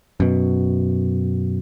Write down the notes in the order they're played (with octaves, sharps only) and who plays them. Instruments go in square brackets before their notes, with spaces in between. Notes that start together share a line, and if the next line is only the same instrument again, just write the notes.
[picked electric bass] F#2 B2